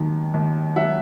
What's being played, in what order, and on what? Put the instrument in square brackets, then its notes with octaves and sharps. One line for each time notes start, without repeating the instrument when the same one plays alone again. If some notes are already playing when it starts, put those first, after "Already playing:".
Already playing: [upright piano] D#2 D#3 F#3
D#2
F#3 E5 F#5